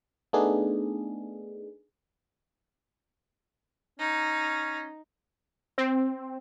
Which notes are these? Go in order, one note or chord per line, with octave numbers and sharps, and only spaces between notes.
A3 B3 D4 D#4 G#4
C#4 D#4
C4